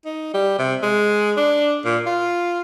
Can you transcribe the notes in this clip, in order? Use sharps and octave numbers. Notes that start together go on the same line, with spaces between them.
D#4
G3
C3
G#3
D4
A#2
F4